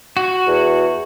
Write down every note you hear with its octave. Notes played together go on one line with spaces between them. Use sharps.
F#4
E2